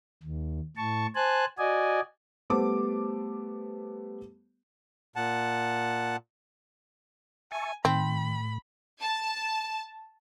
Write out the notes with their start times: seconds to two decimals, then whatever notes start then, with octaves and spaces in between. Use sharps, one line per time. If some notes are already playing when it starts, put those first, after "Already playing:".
0.23 D#2
0.77 A2 A5 C#6
1.15 C5 G#5 A5 F#6
1.58 F#4 D5 D#5 G#5
2.50 G3 A3 B3 C5 A5 D6
5.16 A#2 F#5 A5
7.52 E5 G#5 A5 C#6
7.85 A2 D#3 C4 B5
9.01 A5